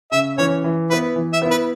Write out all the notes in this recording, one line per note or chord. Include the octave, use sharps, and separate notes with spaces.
C#3 E5
E3 C#4 C#5
E3
B3 E4 B4
E3
E5
B3 E4
B4